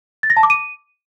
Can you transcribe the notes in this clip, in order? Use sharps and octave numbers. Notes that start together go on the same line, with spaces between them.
A6
A#6
A5
D6
D#7